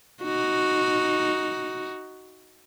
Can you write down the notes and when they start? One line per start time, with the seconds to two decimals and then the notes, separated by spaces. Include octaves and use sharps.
0.23 D#4 F#4